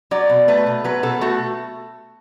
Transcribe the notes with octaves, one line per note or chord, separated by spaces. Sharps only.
F#3 D5
B2
A3 B4
B2
F#3 B4
B2 A4
A3 F#4